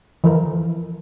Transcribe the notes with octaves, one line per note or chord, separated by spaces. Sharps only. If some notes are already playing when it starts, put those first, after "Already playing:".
E3 F3 A#4